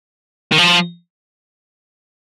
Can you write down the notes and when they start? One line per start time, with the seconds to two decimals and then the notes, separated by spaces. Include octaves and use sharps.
0.52 D#3
0.59 F3